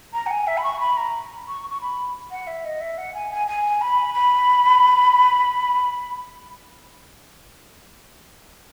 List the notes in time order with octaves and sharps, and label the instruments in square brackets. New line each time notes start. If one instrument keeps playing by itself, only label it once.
[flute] A#5
F#5
G#5
E5
B5
C#6
B5
A#5
C#6
C#6
B5
F#5
E5
D#5
E5
F#5
G#5
G#5
G#5
B5
B5